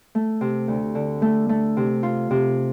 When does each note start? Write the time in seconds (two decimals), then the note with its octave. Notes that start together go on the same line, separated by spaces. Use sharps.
0.15 A3
0.41 C3
0.68 D2
0.95 D3
1.22 A3
1.49 A3
1.77 C3
2.03 F4
2.31 C3